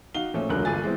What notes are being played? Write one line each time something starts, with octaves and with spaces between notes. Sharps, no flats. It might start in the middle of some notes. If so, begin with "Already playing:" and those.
D#4 F#4 F5 G7
A#2 F3 A3 C#4
E1 C#2 D3 F#3 A#4 F#6
G1 F4 G#4 G#5 A6
E3 G#3 B3 C4